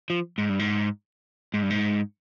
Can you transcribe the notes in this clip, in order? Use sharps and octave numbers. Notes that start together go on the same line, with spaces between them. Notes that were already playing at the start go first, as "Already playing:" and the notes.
F3
G#2
G2
G#2
G#2
G2
G#2